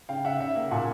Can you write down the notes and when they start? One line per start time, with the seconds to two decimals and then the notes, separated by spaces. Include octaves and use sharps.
0.09 C#3 F5 G5
0.25 C#3 E5 F#5
0.40 C#3 E5
0.56 A#3
0.71 A#2 F#5 G#5